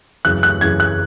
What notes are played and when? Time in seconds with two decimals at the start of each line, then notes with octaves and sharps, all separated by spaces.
0.25 F#2 C#3 E3 F#6
0.43 F#6
0.61 F#2 C#3 E3 G#6
0.80 F#6